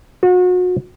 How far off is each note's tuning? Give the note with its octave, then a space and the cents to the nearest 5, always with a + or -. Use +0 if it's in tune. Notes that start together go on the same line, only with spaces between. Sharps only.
F#4 -35